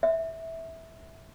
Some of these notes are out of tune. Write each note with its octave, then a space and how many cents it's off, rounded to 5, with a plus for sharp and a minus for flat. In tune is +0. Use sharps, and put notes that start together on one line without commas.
E5 -15